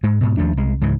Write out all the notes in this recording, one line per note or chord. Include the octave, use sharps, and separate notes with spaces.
G#2 G#3
G#2 B2
D#2 F3 A3 D4
C2 G#3
C#2 G#2 C#3 E3